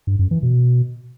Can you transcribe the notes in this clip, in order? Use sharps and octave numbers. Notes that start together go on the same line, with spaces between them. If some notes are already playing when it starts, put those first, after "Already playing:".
G2
F#2
E3
B2